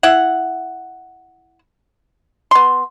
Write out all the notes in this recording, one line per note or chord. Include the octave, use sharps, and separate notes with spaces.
E4 E5 F#5
B3 C6